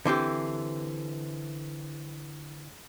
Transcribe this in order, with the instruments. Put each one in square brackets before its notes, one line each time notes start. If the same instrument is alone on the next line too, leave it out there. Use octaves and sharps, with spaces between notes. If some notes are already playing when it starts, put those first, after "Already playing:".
[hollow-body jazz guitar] D3 E3 C4 G4